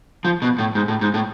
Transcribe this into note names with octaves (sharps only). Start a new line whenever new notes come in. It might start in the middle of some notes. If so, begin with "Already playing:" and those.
F3
B2
A2
G#2
A2
G#2
A2